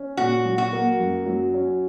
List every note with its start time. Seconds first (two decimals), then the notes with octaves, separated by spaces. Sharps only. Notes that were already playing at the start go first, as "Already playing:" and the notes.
Already playing: C#4
0.17 A#2 F#4
0.45 F#3
0.58 F#4
0.73 A#3
1.00 F#2
1.26 F#3
1.54 C#4